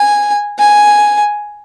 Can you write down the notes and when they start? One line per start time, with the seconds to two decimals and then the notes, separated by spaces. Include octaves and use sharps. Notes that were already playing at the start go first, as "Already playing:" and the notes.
Already playing: G#5
0.59 G#5